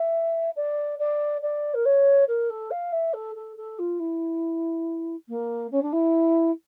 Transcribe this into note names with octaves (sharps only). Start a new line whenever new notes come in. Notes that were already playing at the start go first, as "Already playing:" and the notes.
Already playing: E5
D5
D5
D5
A#4
C#5
A#4
A4
F5
E5
A4
A4
A4
F4
E4
A#3
C#4
D4
E4